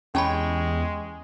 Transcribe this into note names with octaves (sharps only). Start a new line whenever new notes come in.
E2 G#3 C#4 G4 C#5 A5 B5